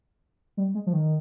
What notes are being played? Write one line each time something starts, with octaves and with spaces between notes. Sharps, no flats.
G3
G#3
F3
D#3